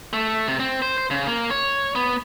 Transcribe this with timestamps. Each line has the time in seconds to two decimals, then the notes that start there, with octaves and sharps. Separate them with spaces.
0.13 A3
0.48 C3
0.60 C4
0.82 C5
0.98 C5
1.10 C#3
1.27 A#3
1.51 C#5
1.95 B3